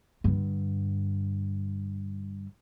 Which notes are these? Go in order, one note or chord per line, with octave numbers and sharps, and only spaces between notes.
G2 D3